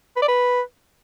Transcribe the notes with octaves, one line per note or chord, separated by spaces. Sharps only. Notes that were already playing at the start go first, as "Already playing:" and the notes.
B4
D5
B4